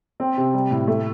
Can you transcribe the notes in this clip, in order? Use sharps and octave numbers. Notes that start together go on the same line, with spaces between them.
C4
C3
G3
A2
A3